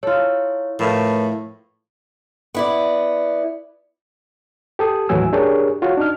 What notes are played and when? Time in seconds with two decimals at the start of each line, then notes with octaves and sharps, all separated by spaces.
0.03 E4 F4 A4 C#5
0.79 A2 F3 A#4 B4 E5
2.54 B3 E4 D5
4.79 G4 A4 D#6
5.09 D#2 A2 E3 F#3 G#5 E6
5.33 D4 G4 G#4 A#4 C#5
5.82 F4 F#4 C#5
5.98 D4 D#4 F6